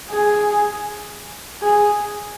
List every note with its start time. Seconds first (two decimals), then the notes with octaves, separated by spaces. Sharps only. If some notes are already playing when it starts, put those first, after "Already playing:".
0.10 G#4
1.62 G#4